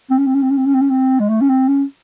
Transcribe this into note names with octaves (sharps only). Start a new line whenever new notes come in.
C4
C#4
C4
C#4
C4
C#4
C4
C#4
C4
C#4
C4
G#3
A3
C#4
C4
C#4